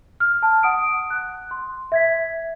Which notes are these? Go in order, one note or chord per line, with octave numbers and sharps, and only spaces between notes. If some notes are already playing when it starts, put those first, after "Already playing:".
F6
A5
F#5 D#6 D7
F#6
C6
E5 G#6 B6